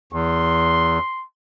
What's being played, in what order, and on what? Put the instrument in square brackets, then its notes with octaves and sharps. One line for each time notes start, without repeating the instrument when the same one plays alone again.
[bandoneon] E2 [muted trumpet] C6